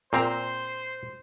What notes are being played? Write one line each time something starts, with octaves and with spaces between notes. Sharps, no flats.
A#2 C4 C5 A#5